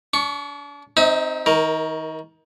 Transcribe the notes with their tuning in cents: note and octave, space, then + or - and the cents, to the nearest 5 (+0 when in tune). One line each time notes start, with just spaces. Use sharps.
D4 -40 C#6 +15
C4 +0 D#4 +0 E5 -45
D#3 +30 A#4 +0